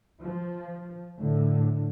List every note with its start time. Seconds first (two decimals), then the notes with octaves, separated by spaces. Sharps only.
0.22 F3
1.18 A2 D3